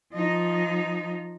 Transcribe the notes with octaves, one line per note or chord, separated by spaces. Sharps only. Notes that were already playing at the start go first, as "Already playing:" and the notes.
F3 D#4